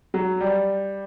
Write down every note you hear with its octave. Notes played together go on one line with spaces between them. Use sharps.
F#3
G3